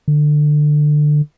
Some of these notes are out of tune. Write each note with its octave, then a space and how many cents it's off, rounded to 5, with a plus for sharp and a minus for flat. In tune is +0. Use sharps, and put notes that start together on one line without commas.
D3 +20